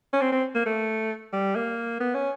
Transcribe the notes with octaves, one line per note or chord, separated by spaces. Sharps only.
C#4
C4
C4
A#3
A3
G3
A#3
B3
C#4